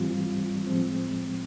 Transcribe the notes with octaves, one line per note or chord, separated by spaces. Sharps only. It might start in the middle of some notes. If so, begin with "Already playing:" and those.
Already playing: G#2 E3 G3 C4 F4
A2 F3 G#3 C4